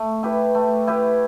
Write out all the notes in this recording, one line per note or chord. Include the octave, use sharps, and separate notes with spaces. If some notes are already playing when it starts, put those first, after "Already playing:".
Already playing: A3
E4 G4 B4
A3
E4 G4 B4